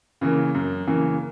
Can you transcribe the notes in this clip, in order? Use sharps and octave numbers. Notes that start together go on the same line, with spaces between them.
C#3 E3 A#3
F#2
C#3 E3 A#3